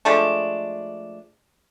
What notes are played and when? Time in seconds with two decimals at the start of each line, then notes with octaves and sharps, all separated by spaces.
0.05 F3 G#3 A3 D4